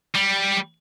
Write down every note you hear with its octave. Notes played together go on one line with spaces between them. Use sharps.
G3